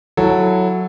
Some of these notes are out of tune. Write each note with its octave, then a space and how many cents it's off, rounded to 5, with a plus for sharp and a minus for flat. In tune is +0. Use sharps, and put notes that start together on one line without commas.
F#3 -5 E4 +0 A4 +0